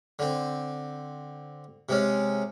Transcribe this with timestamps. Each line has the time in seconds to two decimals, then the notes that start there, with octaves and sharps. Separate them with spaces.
0.19 D3 C4
1.89 C3 G#3 C#4